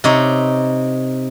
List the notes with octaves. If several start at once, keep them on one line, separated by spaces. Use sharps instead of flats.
C3 D#4 C#5